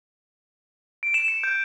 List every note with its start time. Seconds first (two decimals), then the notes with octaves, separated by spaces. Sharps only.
1.03 D7
1.14 E7
1.28 C#7
1.44 G6